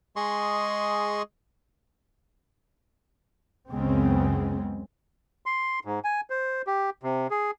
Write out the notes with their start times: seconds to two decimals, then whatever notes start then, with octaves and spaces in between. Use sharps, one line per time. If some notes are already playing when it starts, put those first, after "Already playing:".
0.16 G#3 G#4 D#5 C6 C#6
3.70 C#2 F#2 C#3 G#3 B3 C4
5.46 C6
5.85 G#2
6.04 G#5
6.30 C5
6.67 G4
7.03 C3
7.30 G#4